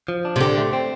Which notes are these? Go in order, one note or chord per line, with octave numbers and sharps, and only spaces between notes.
F3
D4
C3
D3 G4
A3
C4